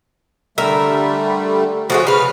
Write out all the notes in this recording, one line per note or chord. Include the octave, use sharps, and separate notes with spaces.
D3 G3 A3 A#4 E5
F3 A3 F#4 G#4 C#5
C#3 B4 F6